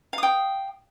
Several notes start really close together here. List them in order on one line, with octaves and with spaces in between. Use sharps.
F5 D#6 G5